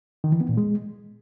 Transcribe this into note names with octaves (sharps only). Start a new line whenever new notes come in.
D#3
E3
B3
A#2
G#3